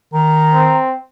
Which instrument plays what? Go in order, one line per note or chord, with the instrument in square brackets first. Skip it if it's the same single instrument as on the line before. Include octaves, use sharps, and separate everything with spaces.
[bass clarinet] D#3 [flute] A#5
[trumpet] C4